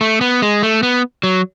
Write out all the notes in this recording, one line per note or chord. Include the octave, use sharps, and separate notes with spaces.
A3
B3
G#3
A3
B3
F#3